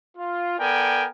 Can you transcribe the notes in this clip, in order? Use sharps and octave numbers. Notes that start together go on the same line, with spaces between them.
F4
B3 A4 A#4 D5 G5 G#5